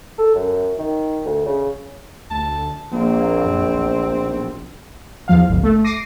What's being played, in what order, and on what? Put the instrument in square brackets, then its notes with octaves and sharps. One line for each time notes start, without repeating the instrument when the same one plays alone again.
[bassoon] A4
F#2
D#3
D2
C#3
[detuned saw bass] D2 [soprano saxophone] A5
[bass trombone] A#1 [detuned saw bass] A#3 [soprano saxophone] C4
[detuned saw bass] F#2
B1
[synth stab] E2 F3 F5
G1 C#2
A3
D6 A#6 C7 D#7